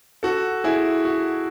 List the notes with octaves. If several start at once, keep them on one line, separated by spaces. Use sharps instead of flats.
F#4 A4
E4 G#4
F#4